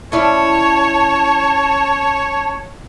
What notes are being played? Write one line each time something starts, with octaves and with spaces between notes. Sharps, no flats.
C#4 E4 C#5 D5 A5